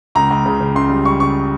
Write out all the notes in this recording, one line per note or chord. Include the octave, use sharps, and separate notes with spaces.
C#2 A#5
C#2
C#3
C#3
C#2 C6
G3
G3 C#6
C#3 C#6